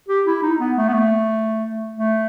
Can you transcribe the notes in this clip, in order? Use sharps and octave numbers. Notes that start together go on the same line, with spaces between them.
G4
E4
D#4
B3
A3
B3
A3
A3